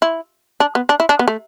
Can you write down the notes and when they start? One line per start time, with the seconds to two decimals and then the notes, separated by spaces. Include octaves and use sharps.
0.02 E4
0.60 D4
0.75 B3
0.89 D4
1.00 E4
1.09 D4
1.19 B3
1.28 A3